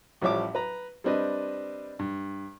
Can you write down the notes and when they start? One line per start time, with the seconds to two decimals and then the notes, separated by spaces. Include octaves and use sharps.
0.22 A1 F3 G3 C#5 E5 D6
0.55 B4 A#5
1.04 G3 C4 D4 B4 D#5
1.99 G2